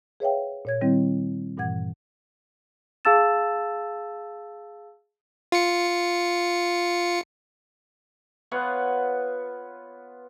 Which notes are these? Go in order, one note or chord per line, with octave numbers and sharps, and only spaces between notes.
G#4 B4 C#5 E5 F5 G5
A#2 C#5 G#6
D#3 G3 C4 E4
G2 A#2 E3 F#5 G#6
G#4 F5 A5 E6 A6 E7
F4 C#7
B3 F4 C#5 F#5